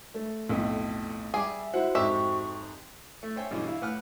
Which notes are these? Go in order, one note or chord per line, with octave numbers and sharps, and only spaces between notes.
A3
B1 F2 A2
G3 G#4 E5 D6
E4 F#4 C5 F#5
F2 G#2 G4 E5 C#6
A3
C5 C#5 E5 G5 G#5
G2 B2 D3 E3 C#4
E4 F5
A2 B4 F#5 F6 F#6